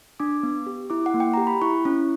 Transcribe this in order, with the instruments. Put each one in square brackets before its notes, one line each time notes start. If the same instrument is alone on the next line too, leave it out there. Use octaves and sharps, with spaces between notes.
[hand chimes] D4 D6
B3
G4
E4 D6
F#5
A#3
G5
G4 A#5
B5
E4 C#6
C#4